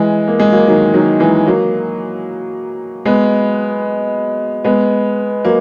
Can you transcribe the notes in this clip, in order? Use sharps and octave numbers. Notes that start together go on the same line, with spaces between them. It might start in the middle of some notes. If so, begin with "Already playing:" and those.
Already playing: E3 G#3
A#3
G#3
F#3 A#3
D#3 F#3
D#3 F#3
E3 G#3
F#3 A#3
G#3 B3
G#3 B3
F#3 A#3